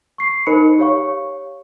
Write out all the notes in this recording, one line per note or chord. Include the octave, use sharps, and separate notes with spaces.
C#6 C7
D#4 A#4 C5 D#5 B5 C#7
G4 C#5 F5 C#6